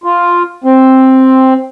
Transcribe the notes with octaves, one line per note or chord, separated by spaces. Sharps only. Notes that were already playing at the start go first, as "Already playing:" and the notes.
F4
C4